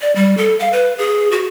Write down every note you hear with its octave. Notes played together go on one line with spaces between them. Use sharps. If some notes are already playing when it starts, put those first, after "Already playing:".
D5
G3
A4
F5
B4
G#4
F#4